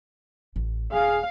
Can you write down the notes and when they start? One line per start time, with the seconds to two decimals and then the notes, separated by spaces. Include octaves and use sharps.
0.56 A1 A2
0.93 D#1 G#4 F5